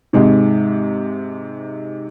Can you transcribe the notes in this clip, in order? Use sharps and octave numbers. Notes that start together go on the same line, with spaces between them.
G#2 C3 G#3